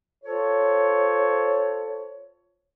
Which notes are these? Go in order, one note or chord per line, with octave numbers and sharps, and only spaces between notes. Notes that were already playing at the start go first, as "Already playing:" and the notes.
F4 A4 C5 C#5